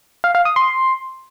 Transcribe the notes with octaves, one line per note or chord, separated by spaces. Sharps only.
F5
F5
D#6
C6